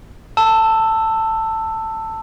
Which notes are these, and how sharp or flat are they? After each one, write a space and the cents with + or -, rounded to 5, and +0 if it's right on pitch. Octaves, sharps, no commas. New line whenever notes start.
A5 +15 E6 +0